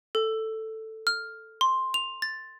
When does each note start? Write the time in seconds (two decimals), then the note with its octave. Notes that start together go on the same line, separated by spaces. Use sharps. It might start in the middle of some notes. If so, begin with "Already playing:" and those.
0.15 A4
1.07 F6
1.61 C6
1.94 F7
2.22 A6